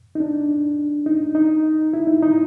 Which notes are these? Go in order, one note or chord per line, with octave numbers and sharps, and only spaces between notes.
D#4
D4
D#4
D#4
E4
D#4
D#4